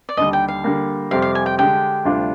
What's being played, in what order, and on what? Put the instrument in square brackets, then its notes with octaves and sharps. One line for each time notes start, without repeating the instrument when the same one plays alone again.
[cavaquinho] D5
[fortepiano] D#2 D3 G3 [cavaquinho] D#5
[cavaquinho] G5
F5
[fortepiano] D3 G3 A#3
[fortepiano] F2 C3 G3 C4 G4 [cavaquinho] F5
[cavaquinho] F5
G#5
G5
[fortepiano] D3 G#3 D4 G4 [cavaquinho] G5
[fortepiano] D2 C3 G3 D4 F4